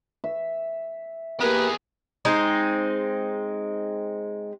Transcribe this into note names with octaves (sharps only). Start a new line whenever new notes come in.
E5
A#3 B3 G4 G#4 A#4 B4
G#3 C4 D#4